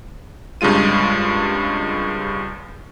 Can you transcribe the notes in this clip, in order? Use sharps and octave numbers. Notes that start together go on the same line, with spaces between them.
C2 G2 C#3 G#3 F4 D#7